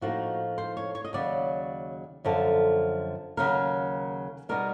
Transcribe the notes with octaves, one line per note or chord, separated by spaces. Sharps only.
A2 F3 A#3 D#4 F#4
C5
C#5
C#5
D#5
D#2 C#3 F#3 D5
F#2 D3 F3 A4
D#2 C#3 F#3 A#4
B2 G3 B3 D#4 A#4